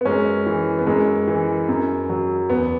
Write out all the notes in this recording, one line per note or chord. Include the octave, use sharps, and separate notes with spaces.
B3
F#2 G#3 C#4
E3
B3
F#2 G#3
E3
F#2
F#3
E2 B3